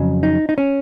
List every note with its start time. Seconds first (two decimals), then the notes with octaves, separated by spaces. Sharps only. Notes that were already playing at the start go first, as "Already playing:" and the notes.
Already playing: F2 C#3 F#3
0.23 D#4
0.49 D#4
0.58 C#4